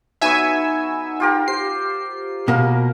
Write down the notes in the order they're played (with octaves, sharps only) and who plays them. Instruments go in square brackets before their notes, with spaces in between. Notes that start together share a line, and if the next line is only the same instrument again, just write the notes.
[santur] F#3 B3 C#6 [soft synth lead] D#4 [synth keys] E5 G#5 E6
[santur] F4 G4 A#4
[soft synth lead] G4 [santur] C5 [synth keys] C7
[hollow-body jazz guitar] B2 A#3 [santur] A#4 F5